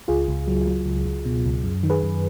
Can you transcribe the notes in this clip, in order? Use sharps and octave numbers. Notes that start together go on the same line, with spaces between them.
C#2 F4 G#4
C#2
F#3
F#3
C#2
C#2
B2
C#2
F#2
D#3
G#4 B4
F#2